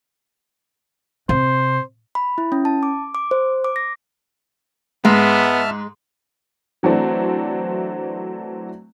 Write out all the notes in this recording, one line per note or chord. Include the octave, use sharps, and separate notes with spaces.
C3 C5
B5
E4
C#4
A5
D6
D6
C5
D6
A#6
G#2 G#3 B3 E5 A5 F6
E3 F#3 A3 C4 D4